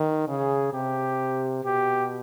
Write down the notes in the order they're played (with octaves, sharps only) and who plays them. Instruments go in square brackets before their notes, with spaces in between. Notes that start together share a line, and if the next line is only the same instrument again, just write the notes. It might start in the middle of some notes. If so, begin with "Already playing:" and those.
Already playing: [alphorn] D#3
[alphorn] C#3 [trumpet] G#4
[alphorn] C3 [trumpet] G4
[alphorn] B2 [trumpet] G4